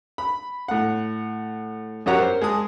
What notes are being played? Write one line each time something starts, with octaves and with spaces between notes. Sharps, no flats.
B5
A2 F#5
F#2 F#3 G4 C#5 F#5 A#5
A#4 C5
G#3 A5 D#6